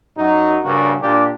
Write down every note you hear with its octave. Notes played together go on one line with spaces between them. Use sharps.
F#2 F#3 D#4
G2 C#3 A#3 D4 F#4 A#4
A#2 D4 G4